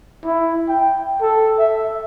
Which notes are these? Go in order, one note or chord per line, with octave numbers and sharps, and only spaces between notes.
E4
G5
A4
E5